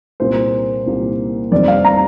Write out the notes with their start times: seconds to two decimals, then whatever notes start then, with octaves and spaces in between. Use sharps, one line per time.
0.20 C2 A#2 A#3 C5
0.86 C2 A#2 A#3
1.51 F1 F2 C3 G3 C4 D5
1.68 F5
1.85 A#5